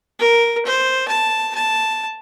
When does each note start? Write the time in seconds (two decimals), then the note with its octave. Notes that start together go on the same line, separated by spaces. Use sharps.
0.19 A#4
0.65 C5
1.08 A5
1.55 A5